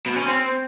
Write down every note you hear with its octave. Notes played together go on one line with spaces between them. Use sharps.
B2
C#4
C4